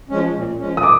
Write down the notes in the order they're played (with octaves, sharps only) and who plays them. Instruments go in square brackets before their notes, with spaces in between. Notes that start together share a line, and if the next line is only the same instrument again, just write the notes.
[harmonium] F3 G#3 C#4
A#2
F3 G#3 C#4
[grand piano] D#6
D6